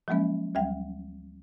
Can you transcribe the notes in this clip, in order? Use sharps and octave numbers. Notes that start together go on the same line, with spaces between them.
F3 F#3 G#3 A#3 C#4
D2 F#3 G3 G5